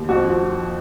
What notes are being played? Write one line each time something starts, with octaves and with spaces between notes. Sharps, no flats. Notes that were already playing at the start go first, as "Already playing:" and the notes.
Already playing: D#2
F2 F#4
F3
F3